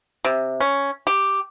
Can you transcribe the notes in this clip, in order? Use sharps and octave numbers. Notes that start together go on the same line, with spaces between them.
C3
C#4
G4